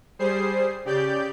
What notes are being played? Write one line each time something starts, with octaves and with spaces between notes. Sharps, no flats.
G3 G#4 C5 C7
C#3 G4 D5 G6